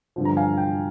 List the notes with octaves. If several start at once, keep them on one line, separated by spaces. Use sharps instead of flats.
G2 D3 F3
A#5
F5 G#5
G5